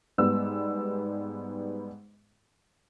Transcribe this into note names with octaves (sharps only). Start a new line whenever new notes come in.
G#2 G3 B3 E6